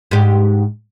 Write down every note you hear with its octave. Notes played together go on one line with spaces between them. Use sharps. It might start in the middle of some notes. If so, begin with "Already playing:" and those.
G#2 G4